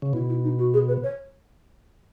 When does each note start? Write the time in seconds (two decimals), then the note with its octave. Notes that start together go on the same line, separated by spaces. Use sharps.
0.02 C#3
0.13 B2 E4
0.29 E4
0.44 D#4
0.59 F#4
0.74 G#4
0.88 B4
1.03 C#5